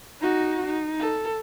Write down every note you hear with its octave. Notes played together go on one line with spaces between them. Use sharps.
D#4 F#4
D#4
A4